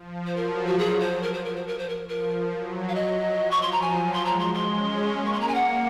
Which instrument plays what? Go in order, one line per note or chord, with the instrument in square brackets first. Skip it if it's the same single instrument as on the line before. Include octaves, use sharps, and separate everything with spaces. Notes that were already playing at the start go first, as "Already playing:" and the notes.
Already playing: [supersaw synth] F3
[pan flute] C5
[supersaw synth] F#3 [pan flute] A#4
[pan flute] F#4
G#4
C5
A#4
C5
A#4
C5
A#4
C5
A#4
[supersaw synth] F3 [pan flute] A#4
[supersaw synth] F#3
[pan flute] F5
[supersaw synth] F#3 [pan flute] D#5
[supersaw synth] F3
[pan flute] C#6
C6
A#5
[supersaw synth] F#3 [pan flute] G#5
[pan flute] C6
[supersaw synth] G#3 [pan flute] A#5
[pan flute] C6
C6
[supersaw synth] C#4
A#3
[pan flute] C#6
C6
A#5
G#5
F#5